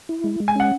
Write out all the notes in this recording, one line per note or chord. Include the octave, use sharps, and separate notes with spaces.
E4
G#3
G#3
G#5
C#4 F#5